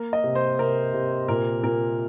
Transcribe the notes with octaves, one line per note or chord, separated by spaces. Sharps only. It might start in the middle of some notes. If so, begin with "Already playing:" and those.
Already playing: A#3 A#4
D#5
C3
C5
C3 A#4
C3
A#2 A#4
A#2 A#4